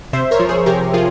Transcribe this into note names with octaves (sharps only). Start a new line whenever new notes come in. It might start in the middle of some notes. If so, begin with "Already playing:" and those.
C3 C5 E5
A#4 C#5
F3
G#4 C5
C3 G4 A#4
F3 F4 G#4